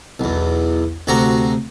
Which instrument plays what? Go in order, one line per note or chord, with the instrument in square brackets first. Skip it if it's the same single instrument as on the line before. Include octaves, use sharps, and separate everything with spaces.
[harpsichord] B1 E2
D2 C3 F#4 A#5